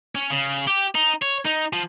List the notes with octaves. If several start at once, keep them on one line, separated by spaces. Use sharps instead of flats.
C#4
C#3
G4
D#4
C#5
D#4
F3